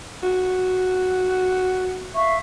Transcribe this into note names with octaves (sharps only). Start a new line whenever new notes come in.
F#4
E5 F5 C#6